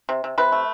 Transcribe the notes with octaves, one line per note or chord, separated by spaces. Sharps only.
C3
C3
C3 B4
A3